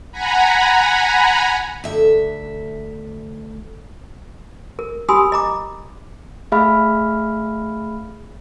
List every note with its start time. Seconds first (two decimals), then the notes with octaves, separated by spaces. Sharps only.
0.12 F#5 G#5 A#5 B5
1.84 D2 E5
4.79 A#4
5.09 G4 G#5 B5 C6 D#6 E6
5.32 D#5 A#5 D6
6.52 A3 G#4 E5 F5 B5 F6